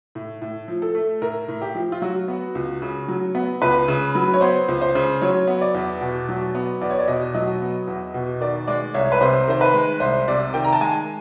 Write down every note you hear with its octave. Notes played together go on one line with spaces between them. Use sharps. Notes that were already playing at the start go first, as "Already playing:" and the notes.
A2
A2
F3
A4
A3
A2 A#4
A2
G4
F3
F4
F#3 F#4
B3
C#2
C#3
F#3
B3
C#2 B4
C#3
F#3
C#5
B3 C5
C#2
C5
C#3
F#3 C#5
B3
D5
E2
B2
F#3
B3
E2 D5
C#5
D5
B2 D#5
F#3 D#5
B3
E2
B2
D#3 D5
G#3 D5
C2 C#5
B4
C3 C5
D#3 C5
B4
G#3
C2 C5
C3 D5
D#3 G5
A#5
A5
G#3 G#5